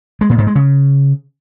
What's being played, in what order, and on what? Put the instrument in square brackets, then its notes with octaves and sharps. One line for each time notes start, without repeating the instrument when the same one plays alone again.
[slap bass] G#3
A#2
G#2
G#3
C#3